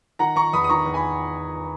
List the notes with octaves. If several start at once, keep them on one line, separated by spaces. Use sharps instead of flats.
D#3 F#5 A#5
D#3 A#5 C#6
E2 B5 D#6
D#6
D#3 A#5 C#6
E2
G#5 B5